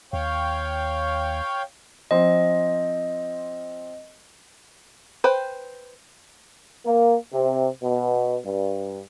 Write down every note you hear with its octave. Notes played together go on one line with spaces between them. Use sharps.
D#2 C#5 F5 G5
F3 C4 D#5 C6
B4 C5 G5
A#3
C3
B2
G2